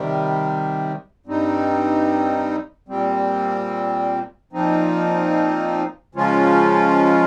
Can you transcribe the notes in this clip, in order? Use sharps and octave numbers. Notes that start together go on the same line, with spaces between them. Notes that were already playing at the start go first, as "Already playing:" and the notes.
Already playing: C3 D#3 G3
G2 G3 C4 D#4
A#2 G3 C4
A#2 F3 C4 D#4
C#3 F3 G#3 C#4 F4